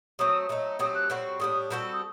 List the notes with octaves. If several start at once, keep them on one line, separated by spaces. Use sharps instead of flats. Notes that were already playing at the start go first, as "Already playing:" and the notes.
F#3 A3 C4 D#6
F#3 A3 D#4
F#3 A3 C4 G4 D#6
F#6
A2 G3 C4 F#4
A2 G3 D4 D#6
G3 C4 F#4 A4
D#6